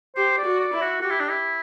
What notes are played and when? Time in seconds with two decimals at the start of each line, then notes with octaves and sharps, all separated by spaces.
0.16 G4 C5
0.38 D5
0.45 F#4
0.60 D5
0.73 E4
0.81 F#4
1.01 F#4 G4
1.10 E4
1.20 D4
1.29 E4